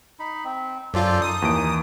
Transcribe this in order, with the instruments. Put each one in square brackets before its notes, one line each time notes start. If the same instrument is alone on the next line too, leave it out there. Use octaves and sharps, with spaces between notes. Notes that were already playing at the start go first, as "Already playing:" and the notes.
[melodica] D#4 B5
C4
[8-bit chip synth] F#2 F4 [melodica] A4 C5 D5
[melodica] D#4 [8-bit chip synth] D#6
[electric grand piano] D#2 E3 D7